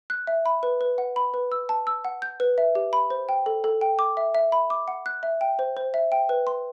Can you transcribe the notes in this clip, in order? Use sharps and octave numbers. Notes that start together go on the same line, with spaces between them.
F#6
E5
B5
B4
B4
F#5
B5
B4
E6
A5
E6
F#5
G6
B4
E5
G4
B5
C5
G5
A4
A4
G5
D6
E5
E5
B5
D6
F#5
F#6
E5
G5
C5
C5
E5
G5
B4
C6